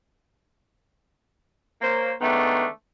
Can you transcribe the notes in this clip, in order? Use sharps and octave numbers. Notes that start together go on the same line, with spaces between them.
A#3 C5 C#5
D#3 G#3 A3 B3 C#4 D4